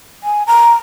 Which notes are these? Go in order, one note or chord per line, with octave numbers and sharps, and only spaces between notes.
G#5
A#5